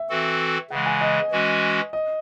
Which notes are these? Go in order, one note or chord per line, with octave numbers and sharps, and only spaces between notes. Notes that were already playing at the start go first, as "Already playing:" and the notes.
Already playing: E5
E3 C4 F#4 A4
C#3 E3 G#3 F#5
G#5
D#5
E3 G#3 C#4 F#4
D#5